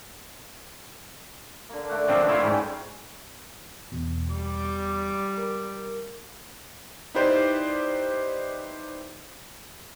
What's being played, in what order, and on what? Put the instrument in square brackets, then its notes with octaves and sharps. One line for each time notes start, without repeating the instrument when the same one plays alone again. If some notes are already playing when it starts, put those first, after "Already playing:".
[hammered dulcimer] D3 A#3
D3 A3 F#5
[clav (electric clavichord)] F3 C4 D4
[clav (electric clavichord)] A3 E4 F4 [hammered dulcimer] C4
[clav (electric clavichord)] G#2 [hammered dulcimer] C#4 B4 G5
[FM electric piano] E2 B2
[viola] G3 D6
[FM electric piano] A#4
[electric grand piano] D#4 E4 G4 B4 C5 D5